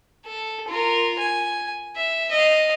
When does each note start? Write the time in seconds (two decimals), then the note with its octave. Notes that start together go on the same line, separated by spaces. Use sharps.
0.26 A4
0.68 F4 A#4
1.19 G#5
1.96 E5
2.31 D#5 F5